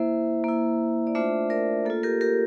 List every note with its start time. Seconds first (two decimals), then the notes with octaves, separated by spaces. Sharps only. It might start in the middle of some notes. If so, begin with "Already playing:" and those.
Already playing: A#3 E4 C5 E5
0.44 A#3 E4
1.07 D5
1.15 A3 D4 F4 C5 E5
1.50 A#4 D5
1.85 A#3 F4 A4
2.03 G4 A#4
2.21 G4 A#4